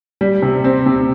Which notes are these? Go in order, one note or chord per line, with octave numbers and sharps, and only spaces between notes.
G3
C3
C4
C3